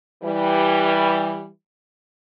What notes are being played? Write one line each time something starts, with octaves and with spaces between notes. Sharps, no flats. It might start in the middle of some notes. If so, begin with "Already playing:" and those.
E3 G3